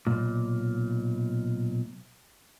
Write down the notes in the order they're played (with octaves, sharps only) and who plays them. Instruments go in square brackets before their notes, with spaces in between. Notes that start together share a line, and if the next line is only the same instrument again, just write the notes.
[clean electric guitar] B1 A#2